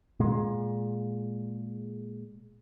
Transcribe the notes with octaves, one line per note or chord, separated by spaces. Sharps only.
A#2 G#3